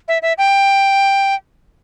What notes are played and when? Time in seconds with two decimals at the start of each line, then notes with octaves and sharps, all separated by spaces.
0.08 E5
0.22 E5
0.38 G5